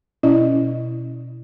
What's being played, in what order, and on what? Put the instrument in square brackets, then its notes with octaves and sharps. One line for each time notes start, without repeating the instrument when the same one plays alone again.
[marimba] B2 C#4 E4 D5 D#5